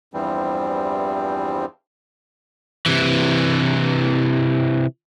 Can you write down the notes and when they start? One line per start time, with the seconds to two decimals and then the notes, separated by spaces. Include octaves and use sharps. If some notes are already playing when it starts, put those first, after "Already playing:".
0.14 E2 G2 E3 F3 G3 C4
2.86 C3 E3